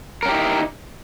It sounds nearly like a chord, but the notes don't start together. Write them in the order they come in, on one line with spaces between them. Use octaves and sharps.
A#4 C#4 G4 E4 D#4